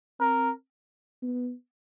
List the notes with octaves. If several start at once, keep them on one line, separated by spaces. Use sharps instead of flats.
C4 A#4
B3